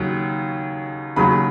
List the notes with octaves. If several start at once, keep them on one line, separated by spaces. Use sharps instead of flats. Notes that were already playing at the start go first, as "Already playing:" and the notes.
Already playing: D#2 C#3 F#3
D#2 C#3 F#3 B5